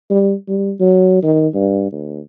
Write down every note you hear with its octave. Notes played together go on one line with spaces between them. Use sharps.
G3
G3
F#3
D#3
G2
D2